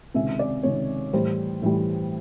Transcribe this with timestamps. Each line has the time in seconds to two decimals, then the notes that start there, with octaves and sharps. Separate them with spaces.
0.14 C#2 C3 D#3 E5
0.39 D5
0.63 C#2 C3 D#3 C#5
1.13 A2 E3 G3 C5
1.62 A2 E3 G3